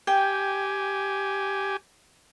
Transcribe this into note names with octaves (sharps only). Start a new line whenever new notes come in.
G4 G5 G#5